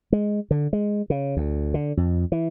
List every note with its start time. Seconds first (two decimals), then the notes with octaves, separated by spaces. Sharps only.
0.12 G#3
0.51 D3
0.73 G#3
1.10 C#3
1.37 D2
1.74 D3
1.97 F2
2.32 E3